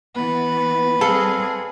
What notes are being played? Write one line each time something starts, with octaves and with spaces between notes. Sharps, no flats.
E3 B3 B4
G3 C4 G#4 A4 F5